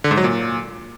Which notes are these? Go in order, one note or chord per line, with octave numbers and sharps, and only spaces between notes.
D3
G#2
F#3
A#2